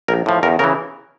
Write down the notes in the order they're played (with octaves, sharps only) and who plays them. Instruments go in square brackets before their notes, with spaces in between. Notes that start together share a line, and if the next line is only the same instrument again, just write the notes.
[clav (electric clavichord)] A#1 A#4
A2 F3
E2 A#4
C#3 E3 A#4